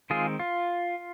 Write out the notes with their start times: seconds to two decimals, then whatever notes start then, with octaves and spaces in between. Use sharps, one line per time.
0.10 D#3 G#3 C4 F4 G#4
0.39 F4